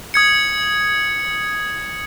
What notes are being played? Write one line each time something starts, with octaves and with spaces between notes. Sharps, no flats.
D#6 G#6 C#7